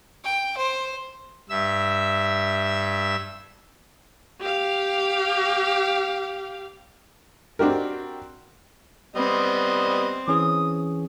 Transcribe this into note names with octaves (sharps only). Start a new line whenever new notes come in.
G5
C5
G2 E5 E6
G4 F5
C4 D4 F#4 G4 A#4
G3 B3 C4 D#5
E3 C#4 G#4 D#6